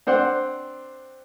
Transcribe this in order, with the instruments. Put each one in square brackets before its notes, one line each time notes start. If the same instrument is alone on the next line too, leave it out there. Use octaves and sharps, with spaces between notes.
[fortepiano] C4 D4 C5 F#5 C6